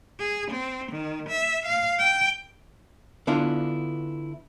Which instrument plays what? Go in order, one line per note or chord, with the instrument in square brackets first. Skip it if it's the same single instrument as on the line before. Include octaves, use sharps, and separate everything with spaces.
[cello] G#4
C4
D#3
E5
F5
G5
[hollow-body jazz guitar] D3 B3 D4 E4 F4